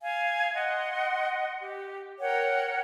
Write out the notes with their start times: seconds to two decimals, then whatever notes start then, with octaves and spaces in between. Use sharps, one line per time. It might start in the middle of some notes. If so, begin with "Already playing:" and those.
0.01 F5 G#5
0.53 D#5 F#5 C6
1.61 G4
2.20 A#4 C#5 F#5 G5